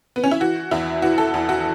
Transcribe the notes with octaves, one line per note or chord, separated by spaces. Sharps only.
B3
C#4
E4
E3 F#4
E2 E4
E3 F#4
A4
E2
F#4